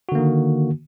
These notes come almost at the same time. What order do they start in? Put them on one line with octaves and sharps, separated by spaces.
F#4 D3 A#3 D#3